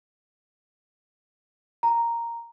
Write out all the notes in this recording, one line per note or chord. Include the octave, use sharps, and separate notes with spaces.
A#5